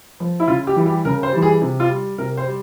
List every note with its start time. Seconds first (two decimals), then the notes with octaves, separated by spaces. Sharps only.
0.20 F3
0.40 E4
0.48 C#3 F4
0.67 G4
0.76 E3 G3
0.86 G4
1.05 C#3 A#4
1.23 C5
1.33 E3 G3
1.42 G#4
1.62 C3
1.80 F4
1.89 G3
2.18 C3 A#4
2.37 C5
2.47 G3